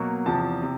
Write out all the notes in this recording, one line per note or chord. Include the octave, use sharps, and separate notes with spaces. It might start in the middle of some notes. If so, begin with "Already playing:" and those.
Already playing: B2 F#3 A#3
E2 C3 F3 A5
C3